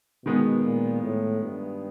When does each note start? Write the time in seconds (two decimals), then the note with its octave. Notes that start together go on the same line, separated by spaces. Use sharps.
0.25 B2 D#3 G#3 B3
0.64 A#2
1.03 A2
1.41 G2